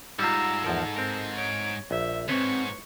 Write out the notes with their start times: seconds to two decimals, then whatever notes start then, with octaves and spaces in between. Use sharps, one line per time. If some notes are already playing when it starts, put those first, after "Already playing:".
0.19 G#2 G3 F4 A#5 E6
0.64 E2 F3 A4 A#4
0.96 C4 A#4
1.34 C#5 D7
1.91 A#1 E5
2.29 D2 G#2 C4 B4 C#5 C#6